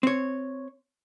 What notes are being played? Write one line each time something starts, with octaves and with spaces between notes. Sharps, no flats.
C4 C#5